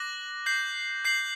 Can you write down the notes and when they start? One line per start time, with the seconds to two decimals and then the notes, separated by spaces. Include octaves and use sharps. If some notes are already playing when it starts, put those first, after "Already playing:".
Already playing: D6 F#6 A#6 F#7
0.46 G6 C7 F#7
1.05 G6 C7 F#7